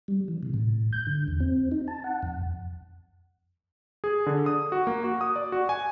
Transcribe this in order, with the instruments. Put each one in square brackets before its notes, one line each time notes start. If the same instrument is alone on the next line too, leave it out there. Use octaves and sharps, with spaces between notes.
[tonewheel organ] G3
E3
C3
A2
G6
D3
E2
C4
D#4
A5
F#5
F2
[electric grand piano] G#4
D3
D#6
F#4
A#3
F#4
D#6
D5
F#4
G#5